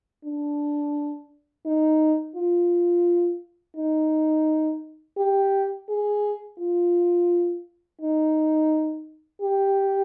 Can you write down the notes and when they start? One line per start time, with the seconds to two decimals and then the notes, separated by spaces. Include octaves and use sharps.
0.24 D4
1.66 D#4
2.36 F4
3.77 D#4
5.18 G4
5.89 G#4
6.59 F4
8.01 D#4
9.42 G4